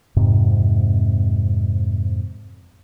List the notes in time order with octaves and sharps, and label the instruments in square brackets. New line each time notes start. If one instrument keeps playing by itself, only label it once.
[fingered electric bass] F2 G#2 C3